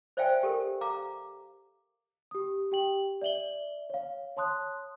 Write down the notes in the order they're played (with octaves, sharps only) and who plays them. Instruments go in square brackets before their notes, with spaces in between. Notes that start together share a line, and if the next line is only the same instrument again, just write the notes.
[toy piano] C5 D5 E5 F5 G5 G#5
G4 A4 A#4
F5 A#5 D6
[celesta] G4 D#6
G4 G5 F#7
D5 E5 F#7 G7
C#5 F5
C#5 A5 C6 D#6 F#6